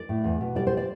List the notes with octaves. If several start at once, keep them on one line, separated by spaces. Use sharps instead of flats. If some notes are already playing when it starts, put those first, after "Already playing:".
Already playing: D5
A2
E2
B2
G3 D5
C5
D5